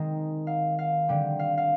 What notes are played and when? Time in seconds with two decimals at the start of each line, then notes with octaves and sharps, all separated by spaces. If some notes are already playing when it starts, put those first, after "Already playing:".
Already playing: D#3 G#3 C4 D#5
0.47 F5
0.79 F5
1.08 D3 G3 C4 G5
1.39 F5
1.57 F5